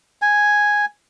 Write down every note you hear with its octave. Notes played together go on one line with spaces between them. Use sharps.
G#5